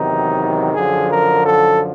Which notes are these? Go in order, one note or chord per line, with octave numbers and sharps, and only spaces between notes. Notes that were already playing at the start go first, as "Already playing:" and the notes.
Already playing: E2 C3 D#3 F#3 D#4
F#2 D3 F3 G#4
A#4
A4